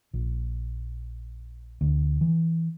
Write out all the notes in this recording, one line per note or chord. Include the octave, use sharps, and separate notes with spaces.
A#1
D2
E3